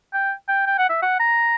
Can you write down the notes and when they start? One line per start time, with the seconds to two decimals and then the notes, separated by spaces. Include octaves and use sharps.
0.13 G5
0.48 G5
0.67 G5
0.78 F#5
0.89 E5
1.02 F#5
1.19 A#5